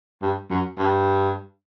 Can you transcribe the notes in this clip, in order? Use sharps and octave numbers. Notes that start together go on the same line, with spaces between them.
G2
F#2
G2